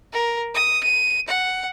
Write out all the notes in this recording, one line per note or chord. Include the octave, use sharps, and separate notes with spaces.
A#4
D#6
D#7
F#5